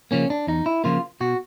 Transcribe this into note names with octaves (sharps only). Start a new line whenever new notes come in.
C#3 F3 A#3 C#4
D4
E2 D#4
E4
C#3 F3 A#3 F4
B2 F#4